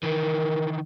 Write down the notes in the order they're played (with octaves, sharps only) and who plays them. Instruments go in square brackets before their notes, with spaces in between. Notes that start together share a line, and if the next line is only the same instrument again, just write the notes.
[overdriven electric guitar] D#3 E3 [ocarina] A#4